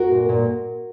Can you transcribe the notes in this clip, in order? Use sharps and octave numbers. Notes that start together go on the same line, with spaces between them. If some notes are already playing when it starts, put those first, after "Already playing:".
Already playing: F#4 A#4
A#2
A#2